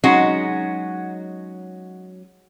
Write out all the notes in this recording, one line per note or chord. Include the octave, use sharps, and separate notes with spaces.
F#3 G#3 C#4 D#4 F#4